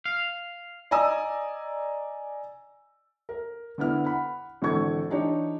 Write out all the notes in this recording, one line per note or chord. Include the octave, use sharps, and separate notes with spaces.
F5
D5 D#5 G#5 A#5 D#6 E6
A#4
D3 B3 E4 F6
F#5 B5
G#1 D3 E3 A4 C#6 G#6
E3 D4 D#4 G4 C#5